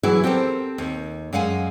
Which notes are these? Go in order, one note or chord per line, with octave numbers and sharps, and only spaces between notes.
E3 F#3 E4 F#4 G#4
C4 G4 A4 A#4 C5
D#2
F#2 G#3 F5 F#5 G#5